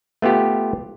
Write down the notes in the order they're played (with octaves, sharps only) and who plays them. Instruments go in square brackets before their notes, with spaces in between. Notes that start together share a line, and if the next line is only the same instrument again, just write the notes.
[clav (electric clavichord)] A3 B3 F4 G4